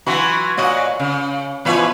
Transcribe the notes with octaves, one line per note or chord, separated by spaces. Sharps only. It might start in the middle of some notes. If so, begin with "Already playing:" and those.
E3 F#3 F#4 B4 G#5 C6
A#2 F#4 C#5 D#5
C#3
B2 E3 F3 B3 B4 C#5